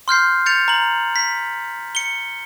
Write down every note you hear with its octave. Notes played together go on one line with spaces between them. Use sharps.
C6 F6 G6 C7
G6 A6 C#7 F7
A#5 F#7
B6
C#7 G7